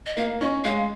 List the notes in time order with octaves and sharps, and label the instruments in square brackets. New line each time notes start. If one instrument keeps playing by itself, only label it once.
[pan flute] D#5
[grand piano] A#3 [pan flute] F5
[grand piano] C#4 [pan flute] D#5
[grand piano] G#3 [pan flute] F5